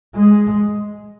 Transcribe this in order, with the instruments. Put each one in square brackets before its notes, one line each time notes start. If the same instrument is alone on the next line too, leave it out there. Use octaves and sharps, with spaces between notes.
[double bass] G#3